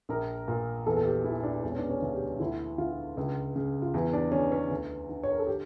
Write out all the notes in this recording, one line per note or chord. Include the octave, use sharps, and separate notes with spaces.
A#1 A#4
A#2
E2 A4
A4
G4
E3 E4
D4
E1 D4
C#4
D4
C#4
D2
G4
D2 E4
D3 F4
C#2
C#3
F4
E2 E4
D4
D3 C#4
C#4
D2
D3
C#5
A#4
A4
G4